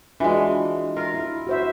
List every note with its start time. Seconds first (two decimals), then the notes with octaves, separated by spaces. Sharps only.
0.20 E3 G#3 D4 F4 F#4
0.96 F4 A#4 F5
1.14 E4
1.47 F#4 C5 E5